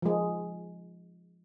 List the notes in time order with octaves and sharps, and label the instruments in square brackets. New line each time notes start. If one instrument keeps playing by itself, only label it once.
[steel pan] F3 G#3